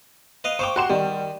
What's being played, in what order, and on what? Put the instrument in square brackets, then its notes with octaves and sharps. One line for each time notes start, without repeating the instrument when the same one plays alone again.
[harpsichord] B4 D#5 F5
[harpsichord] C5 F5 G5 [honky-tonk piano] C#6 D6
[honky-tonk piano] F#4 C6 E7 [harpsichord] G4
[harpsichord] D#3 [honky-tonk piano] G3